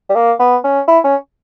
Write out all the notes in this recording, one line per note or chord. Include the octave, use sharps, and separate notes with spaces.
G3
A#3
B3
C#4
E4
C#4